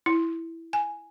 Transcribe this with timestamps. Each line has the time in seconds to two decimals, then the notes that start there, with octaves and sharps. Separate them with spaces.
0.06 E4
0.73 G#5